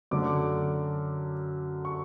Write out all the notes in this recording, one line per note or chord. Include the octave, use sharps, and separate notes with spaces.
F#2 D3 A3 D6
C#6